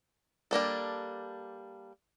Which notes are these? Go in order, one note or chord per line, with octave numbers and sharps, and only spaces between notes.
G3 A#3 D4 A4